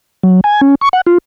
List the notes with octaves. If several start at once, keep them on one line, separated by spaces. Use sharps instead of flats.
F#3
G#5
C#4
C#6
F#5
F4